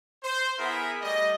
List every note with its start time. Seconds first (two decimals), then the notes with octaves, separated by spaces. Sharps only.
0.24 C5
0.59 B3 E4 G#4 A#4 E5 B5
1.02 G3 A3 D5 D#5